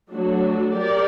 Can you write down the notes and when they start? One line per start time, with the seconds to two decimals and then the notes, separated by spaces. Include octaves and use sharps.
0.12 F#3 A3 D4 F#4
0.74 G4 A#4 D5